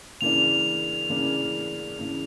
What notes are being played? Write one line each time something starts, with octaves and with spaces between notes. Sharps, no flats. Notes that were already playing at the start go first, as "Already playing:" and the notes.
C#3 E3 A#3 D4 F7
C#3 E3 A#3 D4
C#3 E3 A#3 D4